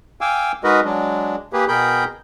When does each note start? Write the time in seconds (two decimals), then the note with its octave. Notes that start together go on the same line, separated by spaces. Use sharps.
0.21 F5 G5 G#5 D6 E6
0.64 G#3 D#4 F#4 A#4 B4 D#5
0.85 F#3 G#3 D4
1.53 A#3 G4 G#4 B4
1.68 B2 G#4 A#4 G5 B5 G6